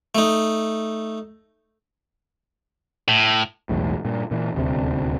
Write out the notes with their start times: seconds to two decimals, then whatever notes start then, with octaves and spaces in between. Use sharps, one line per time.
0.15 A3 D#4
3.08 A2
3.69 E1 B1 E2 A2
4.04 G2 A#2
4.31 A#2 E3
4.54 D#1 D2 C3